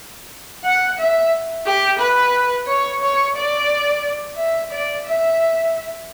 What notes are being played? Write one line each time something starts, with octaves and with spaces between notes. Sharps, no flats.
F#5
E5
G4
B4
C#5
C#5
D5
E5
D5
E5